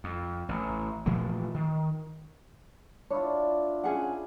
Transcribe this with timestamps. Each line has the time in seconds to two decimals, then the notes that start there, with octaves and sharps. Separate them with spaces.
0.04 F2
0.49 A1 A2
1.06 A#2 E3 F3 A3
1.54 D#3
3.10 D4 E4 F4 C#5
3.84 C#4 G#4 F#5